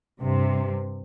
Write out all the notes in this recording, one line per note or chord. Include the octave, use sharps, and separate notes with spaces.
G2 C3